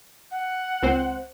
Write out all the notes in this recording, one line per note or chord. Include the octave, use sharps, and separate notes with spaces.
F#5
C#2 C4 C5